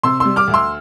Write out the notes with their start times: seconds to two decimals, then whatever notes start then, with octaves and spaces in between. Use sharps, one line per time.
0.03 C3 C6 E6
0.20 G3 C6 E6
0.36 D6 F6
0.48 D2
0.54 C6 E6